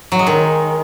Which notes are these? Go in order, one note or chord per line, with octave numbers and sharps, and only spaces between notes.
F#3
G#3
D#3